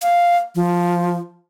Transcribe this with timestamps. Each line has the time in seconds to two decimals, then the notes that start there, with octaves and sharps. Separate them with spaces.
0.02 F5
0.55 F3